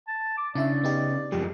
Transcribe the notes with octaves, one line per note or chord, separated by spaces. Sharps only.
A5
D6
C#3 D4 E4 D5 E5
B3 D#4 G4
F#2 F3 G#3 G4